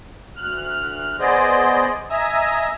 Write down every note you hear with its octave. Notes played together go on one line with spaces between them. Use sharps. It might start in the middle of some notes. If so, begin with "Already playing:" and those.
D2 F6 F#6
B3 G#4 C5 D5 D#5
D#5 E5 G#5 A#5 D#6 E6